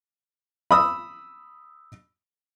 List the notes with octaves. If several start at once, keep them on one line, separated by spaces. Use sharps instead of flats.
B5 D#6 E6